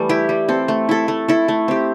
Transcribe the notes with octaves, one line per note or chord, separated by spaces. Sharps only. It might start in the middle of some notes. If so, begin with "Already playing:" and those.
Already playing: E3 G3 A3
E4 G4
G3
C4 A4
A3
E4 A4
A3
E4 A4
A3
C4 G4